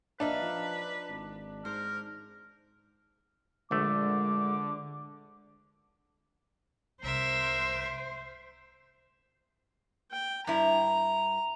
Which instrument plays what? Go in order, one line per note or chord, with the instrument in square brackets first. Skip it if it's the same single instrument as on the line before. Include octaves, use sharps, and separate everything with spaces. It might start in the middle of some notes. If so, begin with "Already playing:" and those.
[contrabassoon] A#1 [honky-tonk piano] D4 [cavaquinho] D#4 E5 F5 [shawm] B4
[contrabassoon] F3
G#1
[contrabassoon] G#2 [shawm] A#4 [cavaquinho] C5
[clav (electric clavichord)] A#1 A3 [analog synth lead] D3 [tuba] G#3 [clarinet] D6
[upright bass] C2 [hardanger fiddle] A#4 E5 [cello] C5
[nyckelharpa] G5
[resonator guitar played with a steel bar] G2 E4 [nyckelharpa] A#5